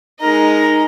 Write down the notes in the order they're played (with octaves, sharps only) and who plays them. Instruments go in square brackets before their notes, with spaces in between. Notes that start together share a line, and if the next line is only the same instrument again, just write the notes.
[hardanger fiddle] G#3 D#5 [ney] D#4 [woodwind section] A#4 A#5